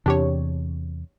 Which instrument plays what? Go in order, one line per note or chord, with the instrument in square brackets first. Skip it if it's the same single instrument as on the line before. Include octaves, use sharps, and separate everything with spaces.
[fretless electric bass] E2 C3 [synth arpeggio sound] D4 G4 C#5